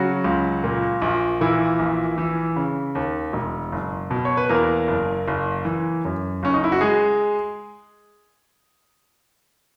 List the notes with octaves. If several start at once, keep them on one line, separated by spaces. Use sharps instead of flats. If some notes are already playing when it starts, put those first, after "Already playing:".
Already playing: C#3 F#3 F#4
C#2
A#2
A#1
A#2 E3 E4
A#1
E3
C#3
D#2
E1
F#1
B2
C#5
B4
E2 A#3 A#4
F#1
F#1
E3
F#2
F#1 C#4
D#4
E4
F#4
G#3 G#4